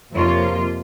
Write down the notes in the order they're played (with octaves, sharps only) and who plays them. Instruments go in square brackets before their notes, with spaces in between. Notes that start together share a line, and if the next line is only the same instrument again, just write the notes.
[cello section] F2 C3 F3 A#3 F4 C#5